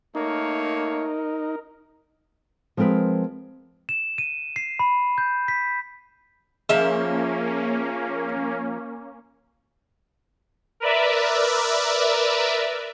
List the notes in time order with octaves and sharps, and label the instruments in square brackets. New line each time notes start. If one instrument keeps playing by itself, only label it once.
[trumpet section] A3 A#3 C#5 [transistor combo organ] D#4 [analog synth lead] A#4
[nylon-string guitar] F3 G#3 C4 A#4 B4
[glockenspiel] E7
D#7
C7
B5
G6
B6
[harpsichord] C#3 [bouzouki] F3 E5 [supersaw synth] A#3 C#4
[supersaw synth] A#4 B4 D5 E5